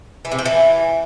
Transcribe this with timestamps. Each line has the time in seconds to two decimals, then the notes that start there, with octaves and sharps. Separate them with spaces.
0.25 E3
0.32 C3
0.39 F3
0.45 E3